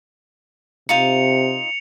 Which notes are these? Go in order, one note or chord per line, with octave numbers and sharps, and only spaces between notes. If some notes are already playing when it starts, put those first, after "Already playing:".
C3 D#4 F4 C5 C#7 F7